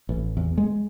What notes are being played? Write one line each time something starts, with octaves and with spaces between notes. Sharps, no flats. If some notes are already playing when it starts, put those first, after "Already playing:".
A1
E2
G#3